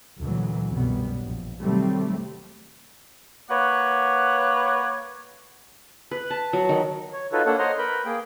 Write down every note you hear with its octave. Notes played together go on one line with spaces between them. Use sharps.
D2 A#2 E3 F#3
C2 F#2 B2 G3 B3
A#1
C3 D#3 F#3 G3 A3 C4
A#3 B4 C#5 D5 F#5
B4
A5
F#3
D#3
C#5
D#4 F4 F#4 A4 B4 C#5
A#3 D4 A4 C#5 F#5
C5 C#5 D#5 F#5 A#5 C6
A#4 B4 B5 G6
A#3 G#4 G5